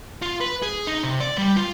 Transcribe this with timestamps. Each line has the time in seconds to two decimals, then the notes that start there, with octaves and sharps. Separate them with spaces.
0.22 F4
0.41 B4
0.62 G#4
0.87 D#4
1.03 C3
1.20 D5
1.38 G3
1.56 F4